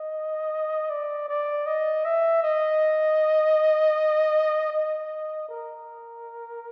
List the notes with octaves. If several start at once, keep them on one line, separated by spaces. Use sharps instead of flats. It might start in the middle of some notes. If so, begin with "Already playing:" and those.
Already playing: D#5
D5
D5
D#5
E5
D#5
D#5
A#4